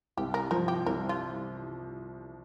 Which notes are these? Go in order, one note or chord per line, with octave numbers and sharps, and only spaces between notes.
C2 G4
A#4
F3 A#4
G4
C2 A#4
F4